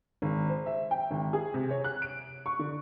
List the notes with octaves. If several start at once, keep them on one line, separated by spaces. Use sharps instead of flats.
G#1
C5
E5
G5
G#1
G#4
C3
C#5
F#6
D7
C#6
D3